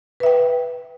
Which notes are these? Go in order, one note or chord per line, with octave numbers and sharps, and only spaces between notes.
B4 E5 G5